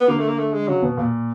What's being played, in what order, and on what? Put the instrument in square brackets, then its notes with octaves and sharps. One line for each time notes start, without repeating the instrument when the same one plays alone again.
[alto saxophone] B3
[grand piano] D3 [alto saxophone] A#3
[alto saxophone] A3
A#3
A3
G#3
[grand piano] C#3 [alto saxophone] F#3
[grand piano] B2
A#2